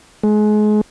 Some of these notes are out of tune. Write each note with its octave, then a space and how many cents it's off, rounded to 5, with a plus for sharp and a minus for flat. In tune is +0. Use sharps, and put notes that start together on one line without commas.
G#3 +30